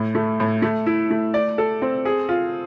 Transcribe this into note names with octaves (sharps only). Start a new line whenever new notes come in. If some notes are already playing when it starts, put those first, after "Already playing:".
Already playing: A2
A3
A2
A3
E4
A3
D5
A4
C4
G#4
F4